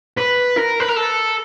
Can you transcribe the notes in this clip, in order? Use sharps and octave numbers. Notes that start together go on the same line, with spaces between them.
B4
A#4
B4
A#4
A4